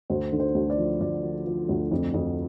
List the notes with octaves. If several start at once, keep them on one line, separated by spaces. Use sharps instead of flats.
D2 C5
D3
C5
D2
D5
F3
D2 D5
F3
F3
D2
F2
F2